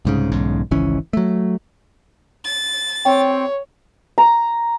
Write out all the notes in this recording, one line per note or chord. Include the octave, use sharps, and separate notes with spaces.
C2 G#2 C#3
B1 E2 G#2 C#3
G#1 C#2 E3 C#4
F#3 A3
A6
C4 C#5 G5
A#5